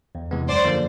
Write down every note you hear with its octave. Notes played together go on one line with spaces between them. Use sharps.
E2
C3 E3 G#3 B3
F#2 C5 D5
D3 F3 A#3